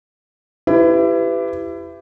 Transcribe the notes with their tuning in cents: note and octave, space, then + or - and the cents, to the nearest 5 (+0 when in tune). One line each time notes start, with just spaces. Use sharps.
E4 +25 G4 +0 B4 +25